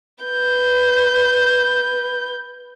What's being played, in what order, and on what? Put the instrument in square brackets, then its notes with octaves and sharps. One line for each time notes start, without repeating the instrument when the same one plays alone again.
[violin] B4 G6